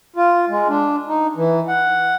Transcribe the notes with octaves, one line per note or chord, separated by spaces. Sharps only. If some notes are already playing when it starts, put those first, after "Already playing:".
F4
G#3
D4
D#4
E3
F#5